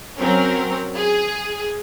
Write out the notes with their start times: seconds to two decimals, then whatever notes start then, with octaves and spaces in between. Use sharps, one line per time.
0.19 F#3 C4 C#4 A#4
0.95 G#4